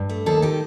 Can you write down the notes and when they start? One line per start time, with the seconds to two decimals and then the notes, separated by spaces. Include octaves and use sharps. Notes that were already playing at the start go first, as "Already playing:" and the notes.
Already playing: G2
0.09 A3
0.26 D#2 A4
0.42 D#3 G4